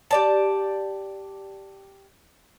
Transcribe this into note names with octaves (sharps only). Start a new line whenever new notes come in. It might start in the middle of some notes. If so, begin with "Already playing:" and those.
G4 D5 A5